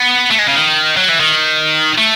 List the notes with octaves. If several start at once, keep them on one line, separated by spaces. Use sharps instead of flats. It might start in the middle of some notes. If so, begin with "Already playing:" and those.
Already playing: B3
A3
G#3
C#3
D#3
F#3
E3
D#3
A3